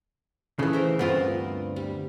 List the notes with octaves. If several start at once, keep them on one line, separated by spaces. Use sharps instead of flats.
C#3 E3 A3
A#4 C5 E5
D2 G2 B3 C4 F4 A#4
G3